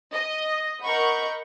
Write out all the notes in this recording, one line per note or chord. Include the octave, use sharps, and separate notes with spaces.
D#5
A#4 D#5 F#5 B5 C#6 G6